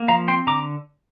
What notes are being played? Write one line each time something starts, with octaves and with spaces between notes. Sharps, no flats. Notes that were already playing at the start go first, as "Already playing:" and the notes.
Already playing: A#3
F3 F5 A#5
C4 G5 C6
D3 A#5 D6